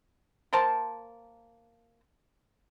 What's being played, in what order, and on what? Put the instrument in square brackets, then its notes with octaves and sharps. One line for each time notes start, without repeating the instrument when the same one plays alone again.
[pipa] A#3 A#4 C5 A5